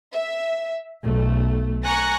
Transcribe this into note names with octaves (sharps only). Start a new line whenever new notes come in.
E5
B1 A3
G#5 A#5 C#6 F#6 A#6